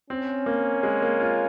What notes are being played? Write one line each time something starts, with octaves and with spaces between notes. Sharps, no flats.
C4 C#4
A#3
G#3
A#3
F4